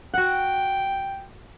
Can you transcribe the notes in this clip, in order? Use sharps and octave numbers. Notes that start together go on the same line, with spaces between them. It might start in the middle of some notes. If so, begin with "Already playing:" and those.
F#4 F#5 G5